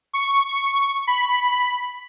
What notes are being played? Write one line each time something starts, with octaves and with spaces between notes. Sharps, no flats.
C#6
B5